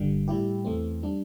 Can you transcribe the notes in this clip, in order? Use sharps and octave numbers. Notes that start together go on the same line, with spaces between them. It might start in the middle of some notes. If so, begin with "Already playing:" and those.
Already playing: G1 G2 D3 G3
A2 G3 E4 G4
E2 E3 A3 C4
G3 D4